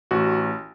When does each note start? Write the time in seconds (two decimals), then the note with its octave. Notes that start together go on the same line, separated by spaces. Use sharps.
0.11 A1 F#4